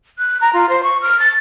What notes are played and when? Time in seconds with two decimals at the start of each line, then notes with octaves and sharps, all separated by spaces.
0.18 F#6
0.41 A#5
0.53 F4
0.69 C5
0.83 C#6
1.02 F6
1.20 A6